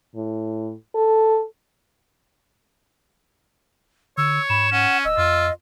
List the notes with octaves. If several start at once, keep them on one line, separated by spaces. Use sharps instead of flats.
A2
A4
D3 C#5 E6
G#2 B5 E7
C#4 F#5
D1 D#5 E6
F2 F4